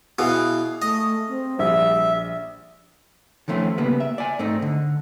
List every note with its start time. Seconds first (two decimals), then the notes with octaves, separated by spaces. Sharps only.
0.19 B2 E3 G#4 F5
0.82 A3 D#5
1.29 C4
1.59 A#1 G3 E5
3.48 D#3 F3 A3 C4 C#4
3.78 C#3 G3 A#3 B3 B4
4.00 E5
4.18 D5 G#5
4.39 G#2 A3 C4 D#4
4.62 D3